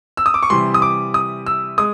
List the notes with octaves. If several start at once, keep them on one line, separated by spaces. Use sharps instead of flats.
E6
D#6
D6
C#6
C3 E3 G3 C6
D#6
D6
D#6
E6
G#3 D#6